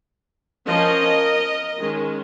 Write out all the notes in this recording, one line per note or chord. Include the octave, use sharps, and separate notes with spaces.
F3 C#4 A#4 D#5
D#3 G#3 C#4